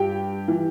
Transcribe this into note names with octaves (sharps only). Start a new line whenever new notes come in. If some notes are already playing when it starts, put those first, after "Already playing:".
Already playing: G2 G4 G5
E3